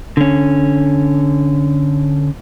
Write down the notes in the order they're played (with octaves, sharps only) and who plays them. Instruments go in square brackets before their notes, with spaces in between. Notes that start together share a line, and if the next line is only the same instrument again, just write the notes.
[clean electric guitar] D3 C#4